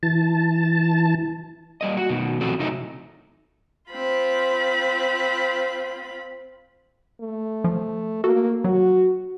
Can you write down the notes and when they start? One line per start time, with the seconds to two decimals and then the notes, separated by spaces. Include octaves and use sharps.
0.03 E3 A5
1.81 G3 A#3 D#5
1.97 F#4
2.10 B2 D#3
2.41 F3 C4 F#4 A4
2.59 C3 D#3 F#3 A3 D#4 E4
3.91 C4 F4 B5
7.21 A3
7.64 F3
8.24 A#3 F#4 A4
8.64 F#3 F#4